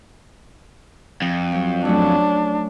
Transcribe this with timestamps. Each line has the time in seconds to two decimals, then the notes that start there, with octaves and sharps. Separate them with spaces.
1.22 F2
1.52 F3 F#3
1.85 F#3 A3 C#4 D4